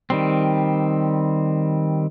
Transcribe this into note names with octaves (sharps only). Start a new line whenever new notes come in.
D#3 G3 C4